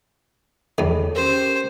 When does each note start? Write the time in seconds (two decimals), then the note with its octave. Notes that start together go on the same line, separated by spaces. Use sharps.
0.78 E2 D#3 G#4 A4 C#5
1.16 C#4 G4 A#4 C5